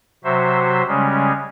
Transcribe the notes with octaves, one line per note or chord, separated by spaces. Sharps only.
C3 F#3 F#4 C5 E5
C#3 G3 G#3 C#4